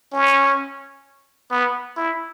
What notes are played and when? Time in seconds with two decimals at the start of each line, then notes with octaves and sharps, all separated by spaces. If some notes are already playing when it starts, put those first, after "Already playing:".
0.13 C#4
1.52 B3
1.97 E4